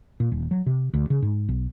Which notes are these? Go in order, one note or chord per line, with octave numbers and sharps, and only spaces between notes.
A#2
D#1
F#3
C3
D2
C#3
G#2
B1